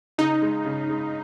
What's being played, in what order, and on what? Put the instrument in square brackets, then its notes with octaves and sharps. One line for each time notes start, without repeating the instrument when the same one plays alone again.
[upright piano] C#3 [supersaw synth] D#4
[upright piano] G#3
C#3
G#3